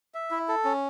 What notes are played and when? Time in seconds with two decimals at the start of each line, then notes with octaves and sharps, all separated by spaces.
0.14 E5
0.31 E4
0.49 A4
0.65 C#4